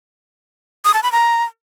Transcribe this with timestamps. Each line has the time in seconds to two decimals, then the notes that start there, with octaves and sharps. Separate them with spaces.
0.85 D#6
0.94 A5
1.03 B5
1.12 A#5